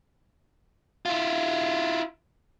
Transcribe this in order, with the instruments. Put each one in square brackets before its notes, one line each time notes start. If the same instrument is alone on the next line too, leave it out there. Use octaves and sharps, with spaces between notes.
[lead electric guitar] E4 F4